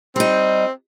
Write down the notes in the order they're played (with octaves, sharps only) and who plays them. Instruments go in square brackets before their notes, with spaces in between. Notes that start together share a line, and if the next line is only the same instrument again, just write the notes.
[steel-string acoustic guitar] G3 D#4 [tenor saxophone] C4